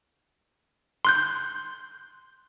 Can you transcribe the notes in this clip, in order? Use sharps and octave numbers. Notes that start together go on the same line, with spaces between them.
C6 F#6 G6